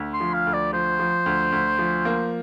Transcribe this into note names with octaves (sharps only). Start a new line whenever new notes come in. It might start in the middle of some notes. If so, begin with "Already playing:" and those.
Already playing: D2
C6
F3
F5
D2
D5
F3 C5
F3
D2
D2
F3
A#3